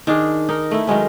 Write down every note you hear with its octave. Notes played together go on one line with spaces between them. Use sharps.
D#3 D4 G#4
D#4 A#4
A3 E4
D#3 F#3 G#3 C#4